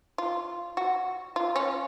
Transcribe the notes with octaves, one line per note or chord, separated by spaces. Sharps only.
F4
F#4
F4
C#4